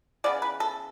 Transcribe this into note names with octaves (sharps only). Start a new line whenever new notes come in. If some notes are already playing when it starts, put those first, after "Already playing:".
C#3 E3 B3 D5
B4
A4